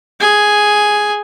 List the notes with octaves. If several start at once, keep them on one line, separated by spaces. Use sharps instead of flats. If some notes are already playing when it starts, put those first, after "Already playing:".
G#4 G#5